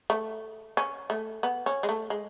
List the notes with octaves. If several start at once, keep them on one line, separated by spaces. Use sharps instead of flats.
A3
C#4
A3
B3
C#4
G#3
A3
G#3